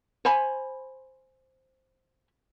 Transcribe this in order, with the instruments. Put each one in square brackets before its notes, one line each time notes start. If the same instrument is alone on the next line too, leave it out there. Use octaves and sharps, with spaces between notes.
[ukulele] C5 G#5 B5